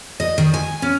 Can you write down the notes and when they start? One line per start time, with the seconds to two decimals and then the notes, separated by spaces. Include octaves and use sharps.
0.20 D#5
0.38 D#3
0.54 G#5
0.82 C#4